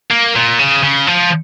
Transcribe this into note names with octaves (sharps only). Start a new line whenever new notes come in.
A#3
A#2
C#3
C#3
F3